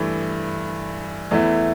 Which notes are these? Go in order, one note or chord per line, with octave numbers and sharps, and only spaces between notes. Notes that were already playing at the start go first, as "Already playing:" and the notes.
Already playing: G2 E3 A3
E2 E3 A3 E4